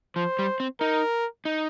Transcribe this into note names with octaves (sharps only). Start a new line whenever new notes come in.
F3 C5
G3
C4
D#4 A#4
D#4